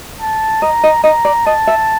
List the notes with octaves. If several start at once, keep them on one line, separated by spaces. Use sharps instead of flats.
A5
D#5 A#5
D#5
D#5 A#5
D5
D#5 A5
E5